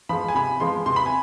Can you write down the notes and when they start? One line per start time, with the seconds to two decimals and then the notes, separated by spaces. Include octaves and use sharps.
0.09 F3 G#3 B5
0.28 G#5
0.35 C3 B5
0.60 F3 G#3 C6
0.86 C3 C6
0.96 B5
1.06 G#5